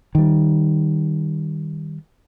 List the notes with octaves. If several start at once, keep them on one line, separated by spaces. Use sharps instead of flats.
D#3 G3